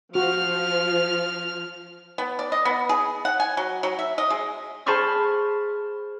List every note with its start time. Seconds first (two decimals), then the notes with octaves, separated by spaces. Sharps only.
0.15 F3 F#4 F6
2.18 B3
2.39 D5
2.52 D#5
2.65 B3
2.89 G#4
3.25 F#5
3.40 G#5
3.57 F#3
3.83 F#3
3.99 E5
4.18 D#5
4.30 G#3
4.86 G#4 C5 A5 B5 C#6 F6